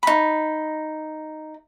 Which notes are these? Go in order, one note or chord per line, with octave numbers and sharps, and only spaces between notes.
D#4 B5